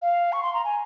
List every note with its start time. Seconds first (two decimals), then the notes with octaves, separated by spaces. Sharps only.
0.02 F5
0.33 C#6
0.43 C6
0.54 A#5
0.65 G#5